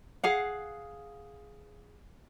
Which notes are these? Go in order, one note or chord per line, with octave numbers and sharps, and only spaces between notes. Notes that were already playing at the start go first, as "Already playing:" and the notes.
G#4 F5 F#5